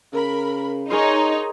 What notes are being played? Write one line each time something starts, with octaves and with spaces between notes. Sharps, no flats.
C#3 A#4 B5
D#4 G#4 A#4 C#5 C6